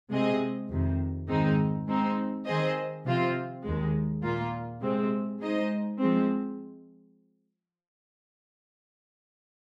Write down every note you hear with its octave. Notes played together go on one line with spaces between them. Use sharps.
C3 G#3 C4 G#4 D#5
F2 C3 D#3
G#2 D#3 G#3 C4 D#4
G#3 C4 D#4
D#3 C4 G#4 C5 D#5
C3 F3 C4 F4
D#2 D#3 G#3
A#2 A#3 F4
C3 G#3 C4
G#3 D#4 C5 D#5
F3 G#3 C4